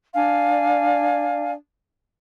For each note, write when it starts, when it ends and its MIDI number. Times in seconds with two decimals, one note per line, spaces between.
0.15 1.52 62
0.15 1.52 74
0.15 1.52 77
0.15 1.52 80